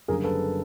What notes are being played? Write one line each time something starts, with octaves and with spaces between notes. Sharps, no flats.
F#1 F#2 D3 G3 G#4 A#4
A4 B4